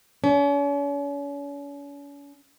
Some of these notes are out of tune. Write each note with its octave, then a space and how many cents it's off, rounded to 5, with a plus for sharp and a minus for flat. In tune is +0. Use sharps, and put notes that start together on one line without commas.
C#4 +40